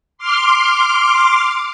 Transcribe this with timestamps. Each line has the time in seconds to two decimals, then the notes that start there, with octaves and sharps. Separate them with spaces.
0.18 C6 D6 F6